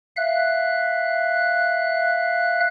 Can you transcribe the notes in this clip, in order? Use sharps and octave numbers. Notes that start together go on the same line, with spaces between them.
E5 F5 F#6